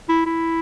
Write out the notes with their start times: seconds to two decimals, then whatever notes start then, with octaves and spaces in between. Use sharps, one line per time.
0.09 E4
0.26 E4